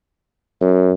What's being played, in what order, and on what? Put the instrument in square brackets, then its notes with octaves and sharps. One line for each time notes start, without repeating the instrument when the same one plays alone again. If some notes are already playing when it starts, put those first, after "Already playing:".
[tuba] F#2